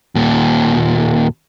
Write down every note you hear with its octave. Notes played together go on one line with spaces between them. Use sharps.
D#2 A#2